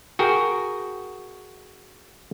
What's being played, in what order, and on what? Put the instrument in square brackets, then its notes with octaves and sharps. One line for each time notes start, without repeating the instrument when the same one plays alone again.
[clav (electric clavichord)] F#4 G#4 A#4 G5